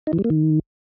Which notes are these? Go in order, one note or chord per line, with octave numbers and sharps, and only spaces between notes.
D#4
E3
G3
A#3
D#3